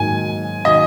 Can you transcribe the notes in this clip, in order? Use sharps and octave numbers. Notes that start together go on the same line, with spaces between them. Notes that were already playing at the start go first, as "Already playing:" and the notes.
Already playing: G#2 D#3 F#3 A#3 G#5
D#3 F#3 A#3 D#5